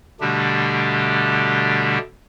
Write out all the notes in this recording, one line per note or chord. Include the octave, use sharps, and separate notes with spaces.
B2 D3 G3 A3 D4 G4